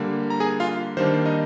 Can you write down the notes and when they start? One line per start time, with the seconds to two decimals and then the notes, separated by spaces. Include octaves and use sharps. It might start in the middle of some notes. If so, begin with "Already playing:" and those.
Already playing: D3 G3 A#3
0.30 A#5
0.40 G#4 G#5
0.60 F4 F5
0.97 D#3 G3 A#3 D4 C5
1.26 D#4 D#5